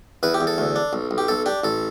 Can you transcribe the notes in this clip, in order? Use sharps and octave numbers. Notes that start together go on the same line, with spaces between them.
E2 B4
G4
E2
A4
D2
D4
B1
B1
G4
B1 A4
D4 G4
A1 A4